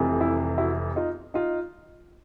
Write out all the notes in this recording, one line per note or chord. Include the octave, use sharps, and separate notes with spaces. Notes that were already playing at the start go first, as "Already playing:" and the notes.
Already playing: F1 F2 C3 E3
E4
E4 F#4
D#4 F4
D#4 F4